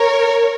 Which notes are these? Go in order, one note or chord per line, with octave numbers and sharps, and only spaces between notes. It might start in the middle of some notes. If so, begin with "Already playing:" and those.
Already playing: A#4 C#5